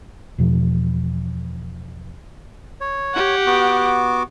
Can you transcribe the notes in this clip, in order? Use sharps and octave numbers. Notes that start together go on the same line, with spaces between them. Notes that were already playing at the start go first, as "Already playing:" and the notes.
E2 B2 F3
C#5
G4 F#5
B3 F#4 D6